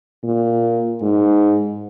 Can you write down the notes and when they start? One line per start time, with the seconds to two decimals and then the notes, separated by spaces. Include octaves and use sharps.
0.24 A#2
1.02 G#2